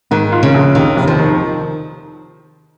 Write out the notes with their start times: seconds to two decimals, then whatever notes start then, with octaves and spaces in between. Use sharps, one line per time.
0.11 G#2 D#3
0.32 F4
0.43 C#3
0.54 A#1
0.75 D#2 D#3
0.97 F1
1.07 F3
1.19 D#3